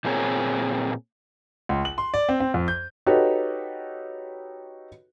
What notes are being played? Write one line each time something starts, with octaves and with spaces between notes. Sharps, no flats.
A#2 A#3 C4 G#4 A#4 C#5
C#2
F#7
C6
D5
C4
C4
F2
G6
D#4 F#4 G4 A4 B4 C#5